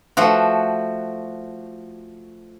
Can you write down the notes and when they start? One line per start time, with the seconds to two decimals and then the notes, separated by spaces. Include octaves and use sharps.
0.17 F3 A3 F#4